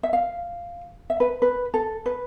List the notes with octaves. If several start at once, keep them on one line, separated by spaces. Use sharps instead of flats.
E5
F5
E5
B4
B4
A4
B4